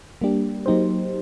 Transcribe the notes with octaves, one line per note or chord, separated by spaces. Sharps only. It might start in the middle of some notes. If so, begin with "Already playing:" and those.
G3 A#3 D4 G4
F#3 A#3 D#4 G4 C5